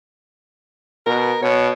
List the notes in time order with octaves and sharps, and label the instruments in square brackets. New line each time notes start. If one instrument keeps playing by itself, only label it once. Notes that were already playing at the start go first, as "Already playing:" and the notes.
[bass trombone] B2 [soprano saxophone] A#4
[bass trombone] B2 [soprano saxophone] C#5